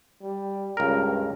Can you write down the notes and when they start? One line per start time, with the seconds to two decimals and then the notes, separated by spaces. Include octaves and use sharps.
0.22 G3
0.77 C#2 G2 A#4